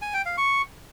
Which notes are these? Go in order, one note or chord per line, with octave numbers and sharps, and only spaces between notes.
G#5
G5
F5
C#6